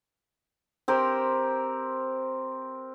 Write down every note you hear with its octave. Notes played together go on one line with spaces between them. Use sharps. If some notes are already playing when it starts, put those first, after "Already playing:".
C4 G4 A#4 C6